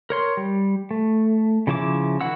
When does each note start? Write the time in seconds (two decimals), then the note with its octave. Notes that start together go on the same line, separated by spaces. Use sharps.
0.10 A#4 C#5 C6
0.37 G3
0.91 A3
1.67 C#3 F3 E4 E5 D6
2.21 D#3 E4 F#4 F#5 E6